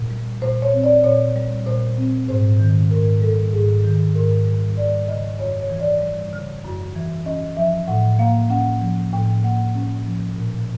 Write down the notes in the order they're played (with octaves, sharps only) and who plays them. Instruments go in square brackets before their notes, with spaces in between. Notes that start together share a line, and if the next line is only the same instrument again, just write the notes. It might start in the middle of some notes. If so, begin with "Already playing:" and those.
Already playing: [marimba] A#2
G3
A#2 C5
C#5
C4
D5
A#2 C#5
G3
A#2 C5
C4
G#2 C5
D#3
G#2 A#4
G3 A4
G#2 G#4
D#3
G#2 A#4
G3
G3 D5
C#3 D#5
F#2 C#5
C#5
E3
D5
G3
C#3
F#2
E3
C#4 D#5
F3 E5
A2 F#5
A#3 F5
C#4 F#5
F3
A2 G5
A#3 F#5
C#4
F3
A#2